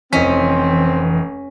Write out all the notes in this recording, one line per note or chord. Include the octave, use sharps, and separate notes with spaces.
F1 E3 C4 C#4 D#5 B6